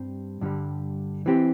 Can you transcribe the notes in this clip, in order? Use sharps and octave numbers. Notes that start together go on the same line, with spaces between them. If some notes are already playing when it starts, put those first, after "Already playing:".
Already playing: G2 G3 C4
G2 D3 G3
E3 C4 G4